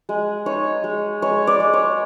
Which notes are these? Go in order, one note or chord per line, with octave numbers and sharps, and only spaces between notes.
G#3
D#4 C#5
G#3
G#3 C#5
D5
G#3
C#5